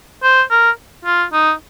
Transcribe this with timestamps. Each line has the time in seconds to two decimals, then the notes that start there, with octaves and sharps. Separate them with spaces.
0.23 C5
0.51 A#4
1.05 F4
1.33 D#4